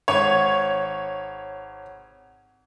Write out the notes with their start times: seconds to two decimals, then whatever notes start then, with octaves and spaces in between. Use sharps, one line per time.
0.08 G#1 C#5